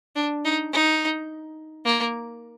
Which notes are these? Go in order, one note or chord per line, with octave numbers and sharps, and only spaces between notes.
D4
D#4
D#4
A#3